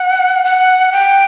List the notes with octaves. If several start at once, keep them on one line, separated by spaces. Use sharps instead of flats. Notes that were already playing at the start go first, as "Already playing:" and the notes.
Already playing: F#5
F#5
G5